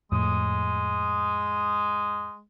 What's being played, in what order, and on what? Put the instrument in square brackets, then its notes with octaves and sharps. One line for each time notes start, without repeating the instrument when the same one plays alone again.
[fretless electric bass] F2 A2 [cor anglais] G#3 [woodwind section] D#6